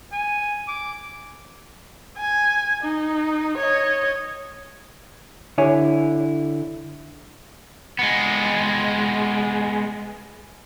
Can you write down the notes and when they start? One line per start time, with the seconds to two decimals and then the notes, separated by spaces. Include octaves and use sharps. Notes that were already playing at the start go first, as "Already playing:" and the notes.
0.12 G#5
0.68 D6
2.18 G#5
2.82 D#4
3.58 C#5 D#5
5.58 D3 E4 G4 C#5 G#5
7.99 G#3 B3